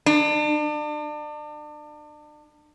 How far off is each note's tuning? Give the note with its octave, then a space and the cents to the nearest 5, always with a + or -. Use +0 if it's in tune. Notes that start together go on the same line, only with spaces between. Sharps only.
D4 +35